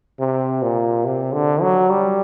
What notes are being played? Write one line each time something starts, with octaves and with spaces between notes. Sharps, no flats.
C3
A#2
C3
D3
F#3
G3